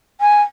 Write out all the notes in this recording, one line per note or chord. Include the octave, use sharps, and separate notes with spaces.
G#5